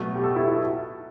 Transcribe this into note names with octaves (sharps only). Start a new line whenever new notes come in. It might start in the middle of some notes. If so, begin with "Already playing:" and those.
Already playing: B2 F#3 A3
G4
A4
E4
E4